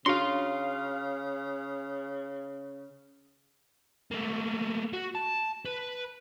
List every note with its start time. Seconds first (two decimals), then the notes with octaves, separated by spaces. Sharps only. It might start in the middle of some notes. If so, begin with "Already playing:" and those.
0.06 C#3 D4 F#4 F5 C6
4.11 A3 A#3
4.93 F#4
5.15 A5
5.65 B4